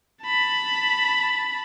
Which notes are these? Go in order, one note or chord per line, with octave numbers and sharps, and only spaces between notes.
A5 B5